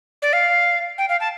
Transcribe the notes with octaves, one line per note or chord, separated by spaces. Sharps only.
D5
F5
G5
F5
A5